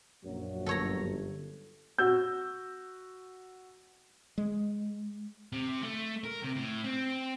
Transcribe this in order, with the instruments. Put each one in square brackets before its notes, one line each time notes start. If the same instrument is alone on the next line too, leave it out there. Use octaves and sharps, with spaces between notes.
[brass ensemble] A#1 F#2 F#3
[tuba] G1 [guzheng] A4 C#5 A#5
[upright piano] F#4 E6 G6
[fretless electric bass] G#3
[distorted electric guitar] C3
A3
A#4
C3
A2
C4